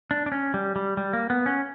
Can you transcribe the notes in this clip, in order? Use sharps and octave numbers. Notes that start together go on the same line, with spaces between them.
D4
D4
C#4
G3
G3
G3
A#3
B3
C#4